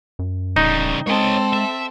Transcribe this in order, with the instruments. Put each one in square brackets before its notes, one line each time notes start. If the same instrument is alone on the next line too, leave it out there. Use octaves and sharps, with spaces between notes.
[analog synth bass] F#2
[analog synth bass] D1 [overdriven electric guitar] C#3 G3 [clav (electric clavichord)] D#4
[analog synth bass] G#3 [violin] C4 A4 [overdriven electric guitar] C#5 D#5
[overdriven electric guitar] E5